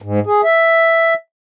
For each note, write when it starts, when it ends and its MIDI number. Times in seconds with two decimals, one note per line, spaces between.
0.02 0.20 44
0.26 0.41 68
0.44 1.14 76